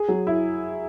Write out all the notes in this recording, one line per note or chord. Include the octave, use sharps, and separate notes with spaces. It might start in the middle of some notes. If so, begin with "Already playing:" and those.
Already playing: G#4
F#3
E4